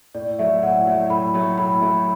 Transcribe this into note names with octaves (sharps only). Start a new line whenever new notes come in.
A2 D5
F#3 A3 E4 E5
A2 F#5
F#3 A3 E4
A2 B5
F#3 A3 E4
A2 B5
F#3 A3 E4